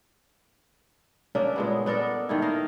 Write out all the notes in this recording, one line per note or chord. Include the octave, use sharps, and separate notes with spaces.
C#3 A#3 D4 E5
A#2 G#3 B3
B3 D4 A4 A#4
D#3 A3 E4
A#3 D#5 F5